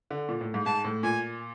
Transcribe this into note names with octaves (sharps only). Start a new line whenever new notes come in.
D3
A#2
A2
G#2
G#2 A5
A2
A#2 G#5